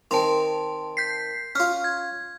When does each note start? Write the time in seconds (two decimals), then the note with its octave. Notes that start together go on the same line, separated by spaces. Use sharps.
0.11 D#3 C4 A5 C6
0.97 G6 B6 C7
1.55 C#4 F4 F6
1.84 G#6